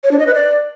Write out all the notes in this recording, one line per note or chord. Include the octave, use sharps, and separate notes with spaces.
C#5
D4
D#5
B4
D5